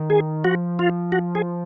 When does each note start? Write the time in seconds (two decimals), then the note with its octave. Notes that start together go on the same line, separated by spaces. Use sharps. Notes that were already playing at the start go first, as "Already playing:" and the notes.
Already playing: D#3
0.10 G#4
0.44 F3 F#4
0.79 F4
1.12 F#4
1.35 G#4